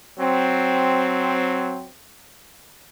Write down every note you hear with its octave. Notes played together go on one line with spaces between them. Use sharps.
F#3 C4